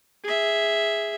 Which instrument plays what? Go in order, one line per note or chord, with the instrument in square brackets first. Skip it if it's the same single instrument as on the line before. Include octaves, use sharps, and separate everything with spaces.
[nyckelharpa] G#4 E5